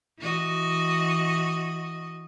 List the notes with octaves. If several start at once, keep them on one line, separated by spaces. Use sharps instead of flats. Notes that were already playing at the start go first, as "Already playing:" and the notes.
E3 F#4 D#5